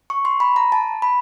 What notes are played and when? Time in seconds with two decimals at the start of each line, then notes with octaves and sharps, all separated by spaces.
0.10 C#6
0.25 C6
0.40 B5
0.56 A#5
0.72 A5
1.02 B5